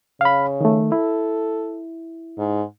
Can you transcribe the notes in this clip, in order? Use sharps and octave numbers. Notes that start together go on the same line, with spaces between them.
C#3 F5 B5
D#3 A3
E4 A4
G#2